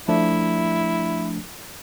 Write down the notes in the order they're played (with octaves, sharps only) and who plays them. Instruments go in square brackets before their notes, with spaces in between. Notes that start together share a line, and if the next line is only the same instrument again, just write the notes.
[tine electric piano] F3 A3 D4 [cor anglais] E4